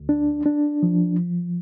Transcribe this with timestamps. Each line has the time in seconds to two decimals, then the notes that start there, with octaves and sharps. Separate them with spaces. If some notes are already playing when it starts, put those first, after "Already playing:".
Already playing: D2
0.09 D4
0.46 D4
0.83 F3